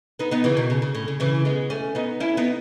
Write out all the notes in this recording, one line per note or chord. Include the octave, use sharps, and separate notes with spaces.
B3 D#4
B3 D#4
C#3 E3
B2 D#3
C#3
C#3
A2
C#3
C#3 E3
G#3 B3
A3 C#4
B3 D#4
C#4 E4
B3 D#4